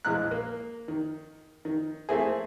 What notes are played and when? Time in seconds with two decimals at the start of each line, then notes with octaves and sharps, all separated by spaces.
0.05 A#1 E2 G#3 D#6 F6 F#6
0.31 A#3
0.88 D#3
1.65 D#3
2.09 A3 A#3 C4 E4 G#4